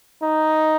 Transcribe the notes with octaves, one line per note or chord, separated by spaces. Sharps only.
D#4